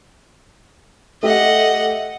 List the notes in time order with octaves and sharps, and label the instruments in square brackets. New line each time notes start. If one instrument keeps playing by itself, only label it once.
[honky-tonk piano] A3 G4 E5 [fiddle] D#5 F#5